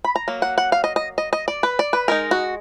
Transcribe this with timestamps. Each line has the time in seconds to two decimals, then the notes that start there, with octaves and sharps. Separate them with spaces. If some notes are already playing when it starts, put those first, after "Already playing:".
0.04 B5
0.16 A#5
0.28 F#3 A#3
0.42 F#5
0.58 F#5
0.72 F5
0.84 D#5
0.96 D#5
1.18 D#5
1.33 D#5
1.48 D5
1.63 B4
1.79 D5
1.93 B4
2.08 G#3 D#4 A#4
2.31 F#4